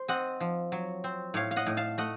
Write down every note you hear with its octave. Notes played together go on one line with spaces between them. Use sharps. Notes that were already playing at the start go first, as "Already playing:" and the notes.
Already playing: C5
C4 D#5 F#5
F3
F#3
C4
A2 C#5 F5
F5
D#5 F#5
A2
F5 A5
A3 D#5 F#5